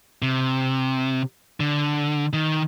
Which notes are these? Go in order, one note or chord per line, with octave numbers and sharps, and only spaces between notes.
C3
D3
D#3